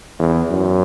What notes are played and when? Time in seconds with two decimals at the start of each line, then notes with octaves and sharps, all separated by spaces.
0.19 E2
0.51 F#2